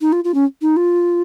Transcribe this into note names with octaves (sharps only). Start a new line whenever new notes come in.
D#4
F4
F4
C#4
D#4
F4